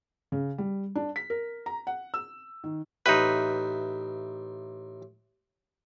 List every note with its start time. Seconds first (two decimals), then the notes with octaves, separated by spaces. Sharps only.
0.32 C#3
0.58 G3
0.96 D4
1.16 B6
1.30 A#4
1.66 A#5
1.87 F#5
2.14 E6
2.64 D#3
3.06 A1 D#4 B4 E5 G5